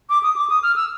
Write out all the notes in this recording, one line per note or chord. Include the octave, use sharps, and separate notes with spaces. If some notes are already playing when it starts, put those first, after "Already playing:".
D6
D#6
D6
D#6
F6
E6